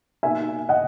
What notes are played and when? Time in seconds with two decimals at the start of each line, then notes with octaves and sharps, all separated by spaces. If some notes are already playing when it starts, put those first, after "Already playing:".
0.23 B2 A#3 D#4 E5 G#5
0.69 D#5 F#5